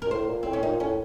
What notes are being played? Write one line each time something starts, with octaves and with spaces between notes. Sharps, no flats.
A#4
F#2
A2 C5
A#2
A2 C4
C#4
A#2 D#4
A2 C#4